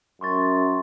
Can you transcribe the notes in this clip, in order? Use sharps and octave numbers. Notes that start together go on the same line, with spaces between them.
F#2 C6 C#6 A6